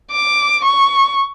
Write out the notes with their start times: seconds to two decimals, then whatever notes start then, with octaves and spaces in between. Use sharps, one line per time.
0.12 D6
0.65 C#6